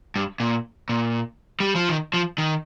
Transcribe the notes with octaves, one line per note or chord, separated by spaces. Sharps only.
G2
A#2
A#2
G3
F3
D#3
F3
D#3